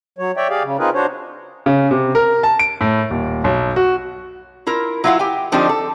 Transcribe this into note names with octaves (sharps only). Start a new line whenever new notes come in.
F#3 C#5
C#5 D5 E5 G5
G4 G#4 D5 F5
C#3
C4 D#4 F4 G#4 A#4 B4
D4 F#4 C5 C#5
C#3
C3
A#4
A5
D7
A2
D#1
B1
F#4
E4 F4 A#4
F#3 E4 F4 C5 F5 F#5
G4 G5 G#5
D3 F3 C4 D4 D#4 G4
A4